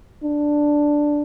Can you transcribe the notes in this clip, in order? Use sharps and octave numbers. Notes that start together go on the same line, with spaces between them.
D4